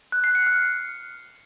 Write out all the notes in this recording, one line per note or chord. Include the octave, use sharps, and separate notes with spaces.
F#6
C7
C#7
F6